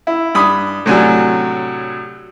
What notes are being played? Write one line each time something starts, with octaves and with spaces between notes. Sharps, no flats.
E4
G2 B5 D#6
A2 C3 F#3 D4 G#5